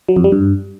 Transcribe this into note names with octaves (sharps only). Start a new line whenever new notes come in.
F#3
F2
G3
G2